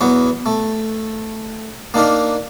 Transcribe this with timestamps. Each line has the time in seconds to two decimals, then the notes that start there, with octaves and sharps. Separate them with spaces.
0.01 E2 F#3 B3
0.46 A3
1.94 A#3 D4 D#4 A#4